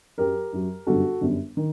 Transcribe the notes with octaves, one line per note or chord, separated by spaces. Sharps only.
F#2 F#3 G4 A#4
F#2 F#3
G1 F#2 D3 G3 F#4 A4
G1 F#2 D3 G3
D#3